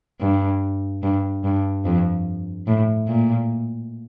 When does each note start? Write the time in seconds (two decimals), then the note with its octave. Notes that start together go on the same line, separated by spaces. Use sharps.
0.21 G2
1.03 G2
1.44 G2
1.85 F2
2.67 A2
3.08 A#2